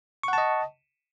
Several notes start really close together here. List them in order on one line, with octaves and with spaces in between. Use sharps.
C#6 F#5 A5 D#5